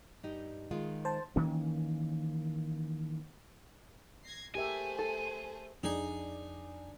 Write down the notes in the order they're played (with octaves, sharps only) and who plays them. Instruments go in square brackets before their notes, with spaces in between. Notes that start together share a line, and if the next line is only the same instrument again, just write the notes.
[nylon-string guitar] G2 D#4 G4
D#3 G#3 F4
[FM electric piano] C5 A5
[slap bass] D#3 E3 A#3 C#4
[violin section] G#6 A#6 C7
[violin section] A3 G#4 C5 [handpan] G4 A#4 E5 [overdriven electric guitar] G#5
[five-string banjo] A4
[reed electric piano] F2 [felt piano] D4 [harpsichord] D#4 G#4 G#5